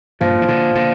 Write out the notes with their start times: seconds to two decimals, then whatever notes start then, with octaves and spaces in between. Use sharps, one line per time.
0.21 G2 A#2 F3
0.42 E3
0.48 A#2 D3
0.75 A#2 D3